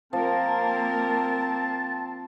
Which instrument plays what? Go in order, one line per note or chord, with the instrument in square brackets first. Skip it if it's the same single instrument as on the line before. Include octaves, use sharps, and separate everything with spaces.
[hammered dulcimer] F3 [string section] A#3 A#4 [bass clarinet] C4 [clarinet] A5